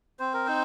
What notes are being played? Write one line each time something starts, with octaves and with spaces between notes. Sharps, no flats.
C4 C5
A#4
D#4 C5